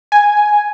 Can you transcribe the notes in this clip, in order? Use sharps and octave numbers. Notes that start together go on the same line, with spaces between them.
G#5